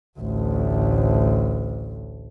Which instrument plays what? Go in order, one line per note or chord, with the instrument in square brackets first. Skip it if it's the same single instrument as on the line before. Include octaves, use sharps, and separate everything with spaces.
[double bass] A1 D2